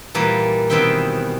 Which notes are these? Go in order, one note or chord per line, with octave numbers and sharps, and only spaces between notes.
A#2 E3 G3 A#3
B2 D#3 E3 C4 E5 G5